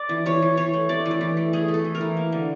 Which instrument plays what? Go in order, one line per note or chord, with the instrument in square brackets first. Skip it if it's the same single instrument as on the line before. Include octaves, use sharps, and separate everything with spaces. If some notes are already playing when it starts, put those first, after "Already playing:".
Already playing: [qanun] D5
E3
E3 C#5
E3
E3 C#5
A3
A3 D5
E3
D5
E3
A3
A3 G#4
A3
A4
E3
A#4
E3
A#3
D3